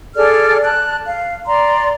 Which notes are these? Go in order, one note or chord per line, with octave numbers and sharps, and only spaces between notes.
G#4 A4 D5 F6
A5 F#6
F5
D5 A#5 C6